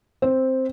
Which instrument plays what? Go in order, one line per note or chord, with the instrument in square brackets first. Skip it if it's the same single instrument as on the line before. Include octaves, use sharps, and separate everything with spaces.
[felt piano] C4